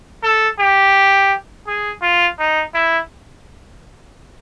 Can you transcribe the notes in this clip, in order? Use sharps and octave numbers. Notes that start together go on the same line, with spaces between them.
A4
G4
G#4
F4
D#4
E4